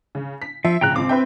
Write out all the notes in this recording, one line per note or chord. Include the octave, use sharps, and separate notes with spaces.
C#3
B6
F3 E5
A#1 C#3 G5 A#5 F#6
C#2 C4 D6
B4 E5 G5